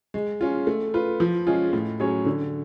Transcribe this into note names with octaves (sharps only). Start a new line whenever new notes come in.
G#3
C#4 F4
A3
F4 B4
F3
G#3 C#4 F4 G#4
A2
F#3 C#4 G#4 C#5
D3